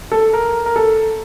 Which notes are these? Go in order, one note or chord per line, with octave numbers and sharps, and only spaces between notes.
A4
A#4
A#4
A4